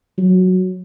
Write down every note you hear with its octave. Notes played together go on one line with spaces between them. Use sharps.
F#3